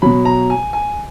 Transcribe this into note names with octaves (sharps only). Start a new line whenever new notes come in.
B2 F#3 B5
A#5
G#5
G#5